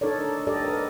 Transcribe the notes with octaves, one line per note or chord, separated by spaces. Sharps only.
D4 D#4 A4 A#4 C#5 D5
G4 A4 D5 D#5
A#4 B4